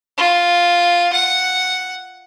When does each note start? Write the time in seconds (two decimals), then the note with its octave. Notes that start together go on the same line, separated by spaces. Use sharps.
0.17 F4
1.12 F#5